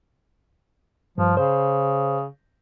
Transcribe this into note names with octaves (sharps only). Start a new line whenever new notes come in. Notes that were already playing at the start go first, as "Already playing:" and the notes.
G2 F3
C#3 C5